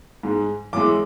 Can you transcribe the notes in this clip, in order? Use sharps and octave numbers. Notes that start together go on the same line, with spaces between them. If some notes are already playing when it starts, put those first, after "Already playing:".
G#2 G#3
F#2 E3 G#3 D6